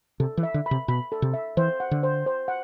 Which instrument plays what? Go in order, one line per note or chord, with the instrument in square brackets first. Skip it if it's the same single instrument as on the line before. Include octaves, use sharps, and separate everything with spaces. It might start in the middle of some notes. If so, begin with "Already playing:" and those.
[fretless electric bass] C3 [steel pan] A4
[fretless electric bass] E3
[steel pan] E5
[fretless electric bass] D3
[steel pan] B5
[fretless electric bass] C3
[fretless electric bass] B2 [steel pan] B5
[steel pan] A4
[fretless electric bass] C3
[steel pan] E5
[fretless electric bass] E3 [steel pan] C5
[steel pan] F#5
[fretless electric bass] D3
[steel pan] C5
C5
F#5